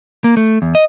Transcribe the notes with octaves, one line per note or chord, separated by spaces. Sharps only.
A#3
A3
E2
D#5